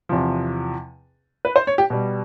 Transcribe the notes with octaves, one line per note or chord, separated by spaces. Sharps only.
E2 C3 F3
B4
C5
C#5
G4
B2 G3